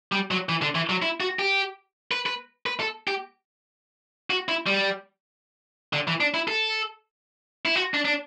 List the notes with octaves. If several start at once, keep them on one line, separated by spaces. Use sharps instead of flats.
G3
F#3
E3
D3
E3
F#3
E4
F#4
G4
B4
B4
B4
A4
G4
F#4
E4
G3
D3
E3
D4
E4
A4
E4
F#4
D4
D4